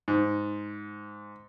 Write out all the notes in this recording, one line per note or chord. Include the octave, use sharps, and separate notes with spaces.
G#2